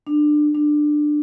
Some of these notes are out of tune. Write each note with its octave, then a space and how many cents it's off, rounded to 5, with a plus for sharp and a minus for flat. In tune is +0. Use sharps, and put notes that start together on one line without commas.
D4 +25
D4 +20